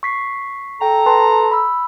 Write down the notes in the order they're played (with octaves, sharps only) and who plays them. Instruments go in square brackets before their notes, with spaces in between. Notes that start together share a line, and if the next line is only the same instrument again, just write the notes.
[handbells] C#6 B6 C7
[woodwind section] A4 A#5 [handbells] G5
[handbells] B4 A5 C6
B5 E6